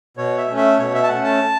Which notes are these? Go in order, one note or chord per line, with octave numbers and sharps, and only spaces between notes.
B2 C#5
E5
A3 C#4
E5
B2 C#5
E5
A5
A3 C#4 F#5
A5